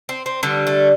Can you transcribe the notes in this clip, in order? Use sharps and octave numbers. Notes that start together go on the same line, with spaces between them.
C4
C4
D3 G3 B3
A3